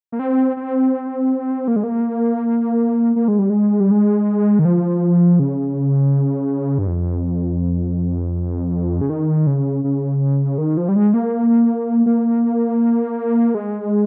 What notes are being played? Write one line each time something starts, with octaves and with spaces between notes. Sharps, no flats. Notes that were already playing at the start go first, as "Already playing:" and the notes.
A#3
C4
C4
A#3
G#3
A#3
A#3
G#3
G3
G#3
G3
G#3
D#3
F3
C#3
G2
F2
C#3
D#3
C#3
C#3
D#3
F3
G3
G#3
A#3
A#3
G#3